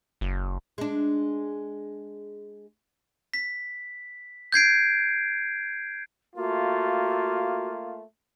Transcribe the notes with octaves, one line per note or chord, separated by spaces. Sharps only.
F#1
G#3 D4
B6
G6 G#6 C7 D7
A3 A#3 F4 F#4